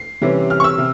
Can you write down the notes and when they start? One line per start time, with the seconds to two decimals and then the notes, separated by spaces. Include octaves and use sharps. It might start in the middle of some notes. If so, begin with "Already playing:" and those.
Already playing: C7
0.22 C3 E3 G3 C#4
0.50 F6
0.60 C#6
0.64 E6
0.78 C3